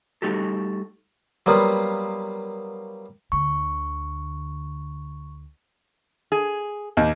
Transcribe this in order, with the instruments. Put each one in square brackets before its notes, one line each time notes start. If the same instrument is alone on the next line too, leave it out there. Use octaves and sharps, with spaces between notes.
[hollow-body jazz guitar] G3 A3 D#4 F#4 G4 A4
[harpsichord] F#3 G3 A#3 B3 F4
[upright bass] D2 D3 [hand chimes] C#6
[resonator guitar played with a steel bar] G#4
[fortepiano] D#2